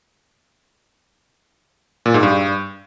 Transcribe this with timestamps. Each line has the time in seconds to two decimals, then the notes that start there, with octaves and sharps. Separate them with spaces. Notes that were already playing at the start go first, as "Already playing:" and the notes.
2.06 A#2
2.14 G#2
2.23 G2